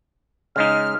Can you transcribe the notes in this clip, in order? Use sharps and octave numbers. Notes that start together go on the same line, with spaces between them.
C#3 G#3 D#4 F6